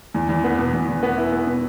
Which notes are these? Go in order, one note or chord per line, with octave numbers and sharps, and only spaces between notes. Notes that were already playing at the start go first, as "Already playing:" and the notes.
E2
E2
B3
B2
E2
E2
B3
E4
B3
B2